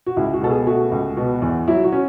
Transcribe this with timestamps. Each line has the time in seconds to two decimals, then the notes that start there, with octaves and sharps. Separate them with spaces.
0.06 F#4
0.17 C#2 E4
0.34 F#4
0.42 B2 A4
0.50 G#4
0.67 A3 F#4
0.92 C#2
1.17 B2
1.42 E2
1.68 F#3 E4
1.84 F#4
1.92 C#4